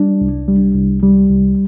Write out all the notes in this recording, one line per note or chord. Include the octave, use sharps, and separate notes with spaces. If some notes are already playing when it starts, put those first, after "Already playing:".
Already playing: G3 D4
C2
G3
C2
G3
C2